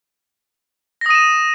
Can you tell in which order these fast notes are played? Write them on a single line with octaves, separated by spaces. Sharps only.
A#6 D#6 D#7 E7